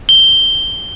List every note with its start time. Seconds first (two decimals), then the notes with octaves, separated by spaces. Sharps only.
0.09 G7